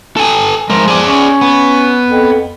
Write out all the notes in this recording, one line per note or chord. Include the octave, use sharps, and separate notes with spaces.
A4 G#5
F3 G#3 A#4
G#4 D5
C#4
B3
F2